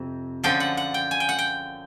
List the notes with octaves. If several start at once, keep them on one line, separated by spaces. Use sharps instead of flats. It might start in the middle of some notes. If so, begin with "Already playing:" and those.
Already playing: F2 C3
F#2 D3 F3 G5
F#5
F#5
G5
G#5
G5
F#5
G5